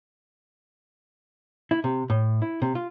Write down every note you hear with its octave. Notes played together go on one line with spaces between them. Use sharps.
E4
C3
A2
E4
C3
F4